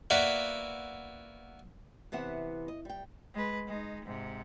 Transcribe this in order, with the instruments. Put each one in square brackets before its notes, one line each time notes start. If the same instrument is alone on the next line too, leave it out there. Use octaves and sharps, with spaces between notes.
[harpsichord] A#3 B3 E4 F#4 D5 E5
[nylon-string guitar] C3 E3 B3 E5 F#5
D#5
G3 G5
[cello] G#3 B4
G#3 D#4
G#2 C3